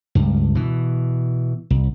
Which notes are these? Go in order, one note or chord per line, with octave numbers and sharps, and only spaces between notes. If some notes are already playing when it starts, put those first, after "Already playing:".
C#2 G2
B2 E3
C2